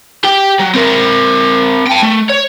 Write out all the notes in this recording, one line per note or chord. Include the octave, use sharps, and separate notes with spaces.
G4 G5
F#3
C4 A#4
G5 A5
A3
C#5